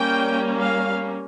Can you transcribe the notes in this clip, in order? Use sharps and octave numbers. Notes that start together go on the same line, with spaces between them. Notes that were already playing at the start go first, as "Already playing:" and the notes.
Already playing: G3 A#3 C#4 G5
F5